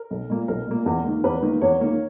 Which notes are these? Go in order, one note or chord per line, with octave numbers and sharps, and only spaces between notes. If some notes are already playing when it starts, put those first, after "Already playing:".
Already playing: A#4
B1
A#2 A#3
B1 A#4
A#2 A#3
E2
D#3 A#3
E2 B4
D#3 A#3
E2 C#5
D#3 A#3